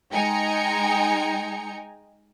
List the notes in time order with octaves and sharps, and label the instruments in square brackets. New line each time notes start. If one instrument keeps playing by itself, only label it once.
[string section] G#3 D#4 G5 G#5 A#5 C#7